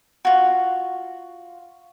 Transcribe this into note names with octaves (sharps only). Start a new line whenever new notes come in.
F4 F#4